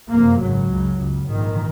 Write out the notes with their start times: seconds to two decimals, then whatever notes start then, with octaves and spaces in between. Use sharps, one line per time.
0.10 F#1 F2 C3 A#3
0.40 G#1 F#2 C#3 F#3
0.69 C#2 C#3
0.98 C#2 C#3
1.26 A#1 G#2 D#3